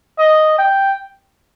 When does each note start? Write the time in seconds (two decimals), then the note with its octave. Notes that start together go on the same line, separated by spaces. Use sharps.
0.19 D#5
0.58 G5